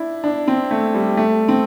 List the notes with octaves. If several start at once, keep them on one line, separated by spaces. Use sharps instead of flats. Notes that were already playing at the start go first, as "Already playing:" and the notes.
Already playing: D4 E4
D4
C4
A3
G3
A3
C4